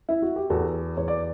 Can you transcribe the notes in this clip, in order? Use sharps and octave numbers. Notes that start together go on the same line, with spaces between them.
E4
F#4
G4
E2 F#4 A4
E2 C#5
D5